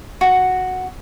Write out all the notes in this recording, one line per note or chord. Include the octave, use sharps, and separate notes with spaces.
F#4